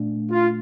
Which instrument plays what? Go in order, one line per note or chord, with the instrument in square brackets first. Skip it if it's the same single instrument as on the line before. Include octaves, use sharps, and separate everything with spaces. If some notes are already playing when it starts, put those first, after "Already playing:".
Already playing: [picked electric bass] A#2 A3 D4
[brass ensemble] F4